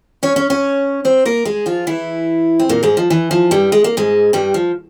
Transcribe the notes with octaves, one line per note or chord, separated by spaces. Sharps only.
C#4 C#5
C#4 C#5
C#4 C#5
C4 C5
A#3 A#4
G#3 G#4
F3 F4
E3 E4
C4
A#2 A#3
G#2 G#3
F3
E3
F3
G2 G3
G#3
A#3
G#2 G#3
G2 G3
F3